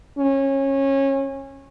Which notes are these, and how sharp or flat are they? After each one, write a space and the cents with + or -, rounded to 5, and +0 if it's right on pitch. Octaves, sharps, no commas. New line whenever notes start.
C#4 -25